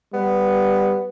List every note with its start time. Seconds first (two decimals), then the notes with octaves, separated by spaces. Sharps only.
0.14 G3 B3